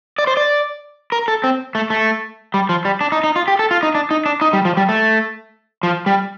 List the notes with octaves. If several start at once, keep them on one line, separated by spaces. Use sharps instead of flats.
D5
C5
D5
A#4
A4
C4
A3
A3
G3
F3
G3
D4
D#4
D#4
F4
G4
A4
F4
D#4
D4
D#4
D4
D#4
G3
F3
G3
A3
F3
G3